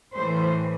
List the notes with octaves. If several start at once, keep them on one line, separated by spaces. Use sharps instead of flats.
A2 E3 C5